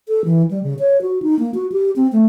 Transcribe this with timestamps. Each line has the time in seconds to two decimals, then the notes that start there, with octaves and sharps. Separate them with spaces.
0.08 A4
0.25 E3
0.51 G3
0.63 C#3
0.79 C#5
1.02 F#4
1.22 D#4
1.39 A#3
1.54 F#4
1.72 G4
1.96 C4
2.12 A3